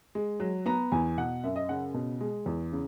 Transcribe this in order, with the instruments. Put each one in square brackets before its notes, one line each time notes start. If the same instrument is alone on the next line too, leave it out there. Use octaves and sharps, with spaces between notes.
[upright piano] G#3
F#3
B3 A#5
E2 G#5
B2 F#5
F#2 E5
D#5
C#3 F#5
B2
G#3
E2
C#3